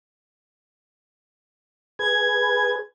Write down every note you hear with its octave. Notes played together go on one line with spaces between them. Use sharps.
G#4 B4 G#6